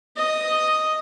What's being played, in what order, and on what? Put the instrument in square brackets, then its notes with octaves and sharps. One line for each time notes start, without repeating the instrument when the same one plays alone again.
[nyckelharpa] D#5